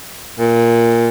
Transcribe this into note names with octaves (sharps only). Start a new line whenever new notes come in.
A#2